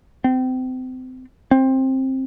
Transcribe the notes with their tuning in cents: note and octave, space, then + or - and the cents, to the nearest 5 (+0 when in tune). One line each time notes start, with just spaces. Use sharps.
C4 -30
C4 +15